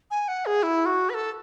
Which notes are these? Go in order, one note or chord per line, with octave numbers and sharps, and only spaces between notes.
G#5
F#5
G#4
E4
F#4
B4
A4